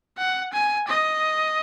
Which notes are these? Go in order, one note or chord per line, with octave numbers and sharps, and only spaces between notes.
F#5
G#5
D#5